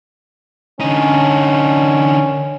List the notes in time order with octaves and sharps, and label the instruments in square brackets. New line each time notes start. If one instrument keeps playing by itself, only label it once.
[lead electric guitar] D3 D#4 [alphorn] C#4